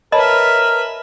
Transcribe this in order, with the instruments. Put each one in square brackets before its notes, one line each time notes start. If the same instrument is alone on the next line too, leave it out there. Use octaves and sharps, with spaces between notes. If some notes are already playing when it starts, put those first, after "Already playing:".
[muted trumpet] A#4 [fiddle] B4 E5 [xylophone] C#5 A5 B5 [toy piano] D#5